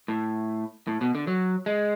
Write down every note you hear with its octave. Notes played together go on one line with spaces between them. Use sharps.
A2
A2
B2
D3
F#3
G#3